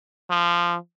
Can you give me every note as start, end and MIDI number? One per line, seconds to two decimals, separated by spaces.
0.30 0.77 53